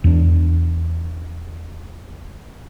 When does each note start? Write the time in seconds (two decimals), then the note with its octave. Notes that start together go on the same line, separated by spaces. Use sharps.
0.04 E2 D4